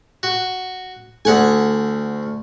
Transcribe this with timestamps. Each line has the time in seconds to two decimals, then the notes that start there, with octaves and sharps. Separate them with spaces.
0.23 F#4
1.25 D2 A3 F#5 G#5